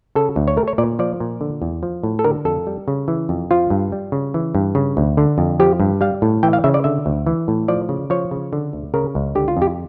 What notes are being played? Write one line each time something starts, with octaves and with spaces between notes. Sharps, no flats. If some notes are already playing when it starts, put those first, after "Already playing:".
C#3 A4
D2
C#5
A3 A#4
C#5
A#2 D5
F3 D5
A#2
D3
E2
F3
A2
A4
D3 A#4
F2 A4
G3
C#3
E3
F2
F3 F4
G2
G3
C#3
E3
G2
C#3
D2
D3
F2
F3 G4
G2
G3 F5
A2
E3 G5
F5
C#3 E5
D5
D3 E5
D2
E3
A2
F3 D5
C#3
F3 C#5
C#3
D3
D2
C#3 A#4
C#2
D3 G4
F4
F2
G4